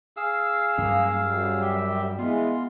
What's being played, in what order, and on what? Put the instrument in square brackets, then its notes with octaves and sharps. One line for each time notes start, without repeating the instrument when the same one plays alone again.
[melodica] G#4 F5 E6
[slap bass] G2 F#3 C#4 [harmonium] A#3
[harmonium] F#2 G3
[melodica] G4 E5
[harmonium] E3 G#3 [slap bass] B3 [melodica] F4 C6